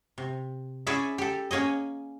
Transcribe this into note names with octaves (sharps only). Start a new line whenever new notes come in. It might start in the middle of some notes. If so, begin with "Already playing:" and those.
C3
C#4 E4 G#4 D5 E5
G4 A4
A#3 C#4 G#4 D#5